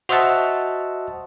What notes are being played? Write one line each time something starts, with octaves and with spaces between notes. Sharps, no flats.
F#4 C5 D#5 E5 F#5 A5